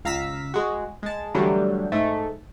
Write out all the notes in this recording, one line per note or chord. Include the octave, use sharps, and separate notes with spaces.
C#2 F5 A#5 E6 B6
G#3 F#4
G#3 A5
D3 E3 F#3 G3 A3
G#2 A3